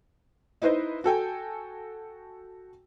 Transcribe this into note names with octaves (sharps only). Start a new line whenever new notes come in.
D#4 E4 B4 C5 D#5
F#4 A4 G5 G#5